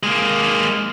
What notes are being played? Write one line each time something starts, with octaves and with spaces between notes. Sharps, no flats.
G#3 A#3